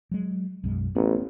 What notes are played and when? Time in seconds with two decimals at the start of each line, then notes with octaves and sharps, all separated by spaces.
0.11 F#3 G#3
0.64 B1 F#2 G#3
0.96 A1 B3